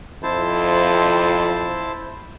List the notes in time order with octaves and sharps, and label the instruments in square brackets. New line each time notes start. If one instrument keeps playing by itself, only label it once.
[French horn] F2 [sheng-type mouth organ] E4 C5 A5